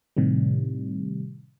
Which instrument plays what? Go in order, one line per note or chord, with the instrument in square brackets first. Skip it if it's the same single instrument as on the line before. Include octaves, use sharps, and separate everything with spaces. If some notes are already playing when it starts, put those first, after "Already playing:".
[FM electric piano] A2 C3 D#3 G3